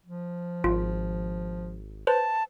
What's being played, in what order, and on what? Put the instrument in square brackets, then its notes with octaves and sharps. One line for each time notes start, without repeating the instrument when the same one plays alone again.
[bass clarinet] F3
[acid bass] G#1 [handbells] F4
[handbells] B4 C5 [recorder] A5